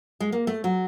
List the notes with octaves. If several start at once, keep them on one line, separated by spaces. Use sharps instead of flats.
G#3
A#3
A3
F#3